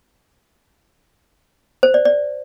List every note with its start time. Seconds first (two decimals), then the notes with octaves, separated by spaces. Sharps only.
1.83 C5
1.94 D5
2.05 D5